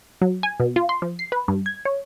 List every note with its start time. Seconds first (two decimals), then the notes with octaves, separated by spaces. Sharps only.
0.21 F#3
0.43 G#5
0.60 B2
0.76 F4
0.89 C6
1.02 F3
1.19 C7
1.32 B4
1.48 G2
1.66 G#6
1.85 C#5